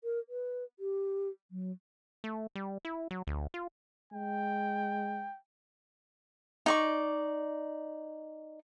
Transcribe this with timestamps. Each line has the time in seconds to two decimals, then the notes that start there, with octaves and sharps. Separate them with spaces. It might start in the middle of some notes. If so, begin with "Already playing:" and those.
0.04 A#4
0.29 B4
0.79 G4
1.51 F#3
2.24 A3
2.56 G3
2.85 E4
3.11 F#3
3.27 D2
3.54 F4
4.13 G#3 G5
6.66 D#4 D5 C#6